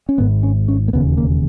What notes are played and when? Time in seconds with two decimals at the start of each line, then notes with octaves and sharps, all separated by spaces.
0.09 C#4
0.18 G#1 G#2 B3
0.43 C#4
0.68 C#4
0.88 A#3
0.93 E1 D#2 C#3 B3
1.17 A#3